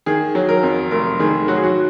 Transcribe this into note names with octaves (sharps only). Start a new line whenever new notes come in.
D#3 G#4
F#3
A#4
F2
F1 A#4
D#3 G#4
F#3 F#4
G#4
F#4